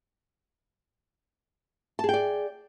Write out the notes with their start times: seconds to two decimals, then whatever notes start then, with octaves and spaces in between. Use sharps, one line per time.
1.99 A5
2.04 G#4
2.09 G5
2.14 D5